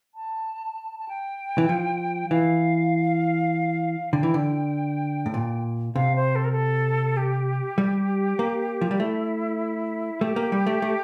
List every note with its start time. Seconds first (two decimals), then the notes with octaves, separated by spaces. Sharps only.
0.15 A5
0.99 A5
1.09 G5
1.58 E3
1.69 F3
2.30 E3 F5
4.13 D3 G5
4.23 E3
4.34 D3
5.26 A2
5.34 A#2
5.95 C3 F5
6.16 C5
6.36 A4
6.44 A#4
6.52 A4
7.17 G4
7.78 G3
8.39 A#3
8.81 F3
8.91 G3
8.99 A3 E4
10.21 A3 G4
10.36 A#3
10.52 G3
10.67 A3
10.82 A3